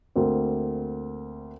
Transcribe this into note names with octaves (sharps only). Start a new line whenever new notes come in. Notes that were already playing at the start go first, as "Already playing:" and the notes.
D2 A#3 C4